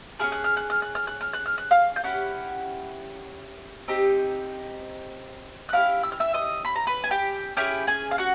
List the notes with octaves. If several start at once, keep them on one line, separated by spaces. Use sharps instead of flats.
C#4 E4 G#4 F6
F#6
F6
F#6
F6
F#6
F6
F#6
F6
F#6
F6
F#6
F5 F6
G6
C#4 E4 G4 F#5 F#6
C4 D#4 G4
F#6
C#4 E4 G4 F5 F6
E6
F6
E5 E6
D#5 D#6
B5
A#5
B4 B5
G#5
G4 G5
C#4 E4 G4 G#4 G5
G#4 G#5
F5
F#4 F#5